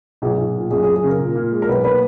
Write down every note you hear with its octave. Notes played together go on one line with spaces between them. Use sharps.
B1 G#4
B1
A#2
F#2 G#4
G#4
F#2
G#4
C#3 A#4
A#2
A#2
G#3
A#4
B1 B4
A#3 B4